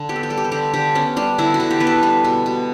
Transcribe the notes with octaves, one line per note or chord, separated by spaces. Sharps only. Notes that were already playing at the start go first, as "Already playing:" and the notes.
Already playing: D3
B3 G4
A4
G4
G3 A4
G4
A4
D3 G4
D3 G4
B3 C#4
G3 D4
D3 E4
F#4
D3
G4
B3 B4
A4
G3 B4
B2
B2